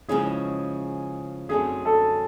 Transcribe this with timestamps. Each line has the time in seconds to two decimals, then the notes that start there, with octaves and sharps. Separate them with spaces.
0.09 C#3 F3 G#3 C#4 E4 G#4
1.49 F#2 D3 F#3 A3 C4 G#4
1.85 A4